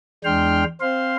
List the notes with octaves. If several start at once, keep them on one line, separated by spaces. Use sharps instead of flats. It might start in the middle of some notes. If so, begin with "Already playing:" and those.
E2 G#3 D4 G5 C6 F6
C4 C5 F5 C6